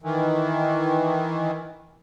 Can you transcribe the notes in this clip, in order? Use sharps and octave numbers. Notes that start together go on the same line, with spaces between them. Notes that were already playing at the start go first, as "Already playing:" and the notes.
D#3 E3